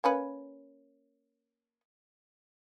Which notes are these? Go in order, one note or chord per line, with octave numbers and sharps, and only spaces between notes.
A#3 C#4 B4